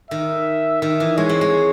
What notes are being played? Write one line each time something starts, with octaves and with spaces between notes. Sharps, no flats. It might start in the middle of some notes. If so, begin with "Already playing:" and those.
D#3 E5
D#3 E5
E3
G#3 C#5
C4
G#3